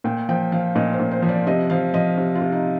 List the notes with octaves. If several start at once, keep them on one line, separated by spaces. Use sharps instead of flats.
A#2 G5
F3 G5
F3 F5
A#2 D#5
C5
A#2
C5
F3
D5
C3 D#5
F3 F5
F3 D#5
C3
F4
C3
D#4